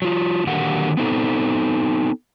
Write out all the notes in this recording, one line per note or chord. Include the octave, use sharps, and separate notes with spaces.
F#3 F4
D3 D#3 F#3 A#3 G4 F#5
B3 C4 D#4 A4